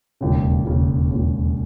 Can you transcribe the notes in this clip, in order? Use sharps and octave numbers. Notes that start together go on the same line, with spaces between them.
E1 D#2 C#3
E1 D#2 C#3
E1 D#2 C#3